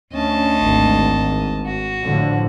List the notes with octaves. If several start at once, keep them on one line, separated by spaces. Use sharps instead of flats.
D2 C#4 D#5 A5
G#1
F#4
A2 D3 F3